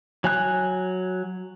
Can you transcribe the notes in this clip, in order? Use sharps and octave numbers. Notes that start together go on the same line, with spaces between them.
F#3 G#5 F#6